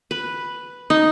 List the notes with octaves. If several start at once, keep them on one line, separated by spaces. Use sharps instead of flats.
B4
D#4